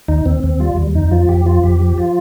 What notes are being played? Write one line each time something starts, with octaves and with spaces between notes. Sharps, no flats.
D#2 D#4
D#2 C4
D#2 C4
G3 F4
D#2
F2 D#4
F3 F4
F2 G4
F3 F4
F2 G4
F3
F4